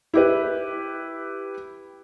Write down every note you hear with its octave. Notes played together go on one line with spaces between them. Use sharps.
E4 G4 B4